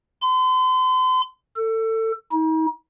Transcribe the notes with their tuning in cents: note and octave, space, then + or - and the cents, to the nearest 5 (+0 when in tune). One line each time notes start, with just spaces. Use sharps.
C6 -40
A4 +25
D#4 +40